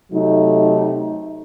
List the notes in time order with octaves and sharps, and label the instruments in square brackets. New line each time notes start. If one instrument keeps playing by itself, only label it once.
[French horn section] C3 F#3 A3 D#4